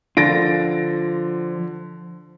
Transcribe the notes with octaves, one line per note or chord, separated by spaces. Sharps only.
D3 F3 F4 A6 A#6 D7